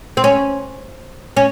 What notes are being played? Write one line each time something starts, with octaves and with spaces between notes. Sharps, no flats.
C4
C#4
C#4